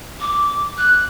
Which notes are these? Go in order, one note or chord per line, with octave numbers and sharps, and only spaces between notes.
D6
F#6